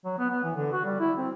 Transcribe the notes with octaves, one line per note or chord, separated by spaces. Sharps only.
F#3
B3
B3
E3
D3
F#4
G3
E4
C4